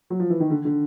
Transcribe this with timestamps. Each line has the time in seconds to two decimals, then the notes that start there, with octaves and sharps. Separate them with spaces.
0.10 F#3
0.20 F3
0.30 E3
0.40 D#3
0.50 D3
0.65 D3